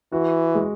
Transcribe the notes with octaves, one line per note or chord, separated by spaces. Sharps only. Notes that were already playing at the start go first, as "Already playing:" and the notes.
E3 F#4
G#3